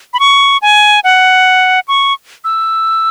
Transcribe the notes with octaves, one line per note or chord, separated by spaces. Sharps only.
B5
C#6
G#5
F#5
C#6
E6